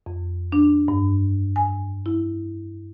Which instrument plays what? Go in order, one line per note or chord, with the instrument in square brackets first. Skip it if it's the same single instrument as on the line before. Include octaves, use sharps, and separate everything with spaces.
[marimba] F2
D4
G2
G#5
E4